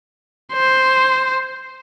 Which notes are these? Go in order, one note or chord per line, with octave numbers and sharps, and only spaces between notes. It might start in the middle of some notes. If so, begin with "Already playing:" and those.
C5